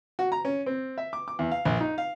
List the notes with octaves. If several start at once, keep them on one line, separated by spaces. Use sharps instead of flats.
F#4
A#5
C#4
C4
E5
D6
D6
E2
F5
A#1
D#4
F5